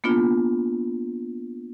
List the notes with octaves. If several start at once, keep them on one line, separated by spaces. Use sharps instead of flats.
A#3 B3 D4 F4